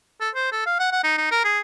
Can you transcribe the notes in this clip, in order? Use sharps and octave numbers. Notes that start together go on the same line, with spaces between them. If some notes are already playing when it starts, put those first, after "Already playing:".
A4
C5
A4
F5
F#5
F#5
D#4
D#4
A#4
G#4